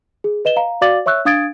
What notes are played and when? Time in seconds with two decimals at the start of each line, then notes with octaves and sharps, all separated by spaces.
0.24 G#4
0.45 B4 D#5 E7 G7
0.56 F5 A#5
0.81 F#4 D5 F5 D6 A6 F#7
1.06 C#5 E5 C#6 E6 F#6
1.25 D4 F5 D#6 G#6 A6 D7